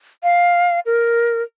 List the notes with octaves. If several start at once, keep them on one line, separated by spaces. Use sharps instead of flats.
F5
A#4